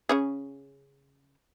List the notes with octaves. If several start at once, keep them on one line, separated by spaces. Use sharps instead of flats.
C#3 C#4 G#4